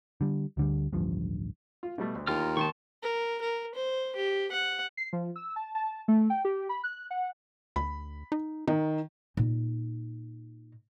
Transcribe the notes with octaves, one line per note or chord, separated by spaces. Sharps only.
D3 G3
D2 D3 G3
D1 A1 G2 F3
F4
B2 G3 A3
D2
D#2 F4 A#5 F6
D#3 A5 C6 C#6
A#4
A#4
C5
G4
F#5
C7
F3
E6
A5
A5
A3
G5
G4
B5
F#6
F#5
D2 B5
D#4
D#3 D#4
A#2 D#4